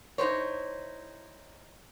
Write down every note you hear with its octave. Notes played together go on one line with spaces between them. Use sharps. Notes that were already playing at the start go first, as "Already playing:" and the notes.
D#4 E4 G4 A4 C5 C#5